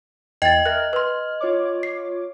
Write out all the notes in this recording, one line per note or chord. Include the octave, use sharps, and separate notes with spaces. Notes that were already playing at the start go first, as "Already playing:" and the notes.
E2 D#5 G5 A6
A#4 E5 F6 F#6
B4 C6 F6
F4 C#5 D6
C7